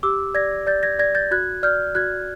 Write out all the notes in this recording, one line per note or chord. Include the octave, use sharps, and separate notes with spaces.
G4 D6 E6
D5 G#6 A#6
D5 G6 A6
G#6 A#6
D5 G#6 A#6
G6 A6
F#4 F#6 G#6
D5 F6 G6
F#4 F#6 G#6